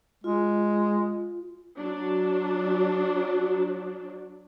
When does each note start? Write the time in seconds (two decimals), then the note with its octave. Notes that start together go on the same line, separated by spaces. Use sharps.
0.24 G#3 F4
1.78 F#3 D4